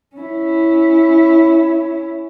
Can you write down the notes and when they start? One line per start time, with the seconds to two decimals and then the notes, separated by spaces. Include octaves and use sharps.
0.16 C#4 E4